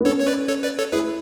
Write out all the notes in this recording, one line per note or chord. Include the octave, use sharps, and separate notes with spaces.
B3
C#4 A4 C#5
C#5
B4 D5
A4 C#5
B4 D5
A4 C#5
E4 G#4 B4